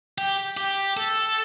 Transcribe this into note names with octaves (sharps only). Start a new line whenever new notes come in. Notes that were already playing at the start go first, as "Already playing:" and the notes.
G4
G4
A4